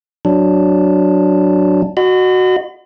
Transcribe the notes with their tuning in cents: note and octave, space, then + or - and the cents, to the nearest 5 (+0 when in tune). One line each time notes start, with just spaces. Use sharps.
F#3 +0 D4 +0
F#4 +0 D#5 -35 B5 +40